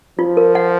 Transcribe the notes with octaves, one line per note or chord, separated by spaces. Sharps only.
F3 F4
A#4
F#5